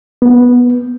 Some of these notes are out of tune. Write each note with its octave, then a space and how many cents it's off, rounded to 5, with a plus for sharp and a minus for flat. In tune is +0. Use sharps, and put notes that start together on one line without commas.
B3 -10